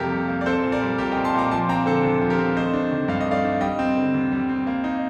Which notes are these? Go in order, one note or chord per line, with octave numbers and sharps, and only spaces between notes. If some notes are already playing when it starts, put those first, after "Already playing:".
Already playing: F2 C3 G3 A#3 G4 A4 A#4
G3
A#3
D5
C4 A4 C5
A#2
A#4 D5
G3
A#2 G4 A#4
D#5 G5
C4
A5 C6
A#2 A#5 D6
F3 A5 C6
C4 G5 A#5
D3 A4 C5
D#2 A4
F3
G4 A#4
C4
A3 C5 D#5
D4
D#3
G2 F5
D#5
A3
D5 F5
D4
G3 D#5 G5
C4
D3
D#2
G3
C4
A#3
D#4